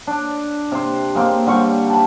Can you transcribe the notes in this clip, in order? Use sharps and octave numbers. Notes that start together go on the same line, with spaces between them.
D4
C3 C5
G#3 A#3 C4
D3 G3 C4 C#6
A5 B5